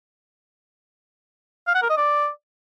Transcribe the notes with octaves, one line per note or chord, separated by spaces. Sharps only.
F5
F#5
A#4
D#5
D5